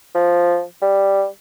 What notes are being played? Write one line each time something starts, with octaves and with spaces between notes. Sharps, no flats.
F3
G3